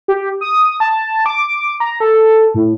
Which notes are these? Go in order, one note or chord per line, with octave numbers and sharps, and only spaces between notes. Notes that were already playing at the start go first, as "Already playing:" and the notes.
G4
D#6
A5
D6
A#5
A4
A2